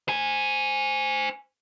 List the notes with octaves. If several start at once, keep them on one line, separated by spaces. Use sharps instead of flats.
C5 G#5